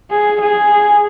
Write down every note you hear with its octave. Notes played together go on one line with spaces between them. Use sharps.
G#4
G#4